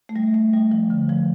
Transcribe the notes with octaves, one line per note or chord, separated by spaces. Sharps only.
A3
G3
A3
G3
F3
D3
F3